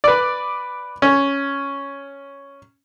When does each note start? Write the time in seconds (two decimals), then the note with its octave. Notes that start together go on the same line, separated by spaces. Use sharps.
0.04 B4 D5
1.02 C#4